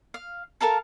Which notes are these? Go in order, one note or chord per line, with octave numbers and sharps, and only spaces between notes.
F5
A4 A#4 F5 A5